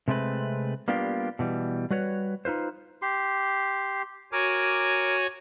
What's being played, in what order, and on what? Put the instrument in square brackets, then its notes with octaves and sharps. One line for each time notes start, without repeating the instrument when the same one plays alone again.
[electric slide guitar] C3 G#3 A3 C4 B4
G3 A#3 B3 D4 F4 G4
B2 E3 G3
G3 F#4 B4 C#5
D#4 F4 B4 C5
[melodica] G4 C6
[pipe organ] F#4 C#5 G#5 [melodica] A#4 D6